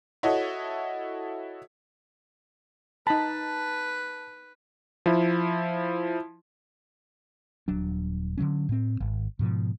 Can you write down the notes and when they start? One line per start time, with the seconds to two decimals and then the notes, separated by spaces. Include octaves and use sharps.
0.23 E4 F#4 A4 C#5 D#5
3.07 D#4 B4 A5 B5
5.06 F3 E4
7.68 D#1 F#3 D4
8.38 D3 D#3 F#3 C#4
8.69 A2 C4
9.00 G#1
9.39 G#2 B2 F3